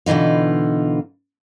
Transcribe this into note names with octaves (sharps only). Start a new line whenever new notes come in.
B2 D3 E3 D#4 F4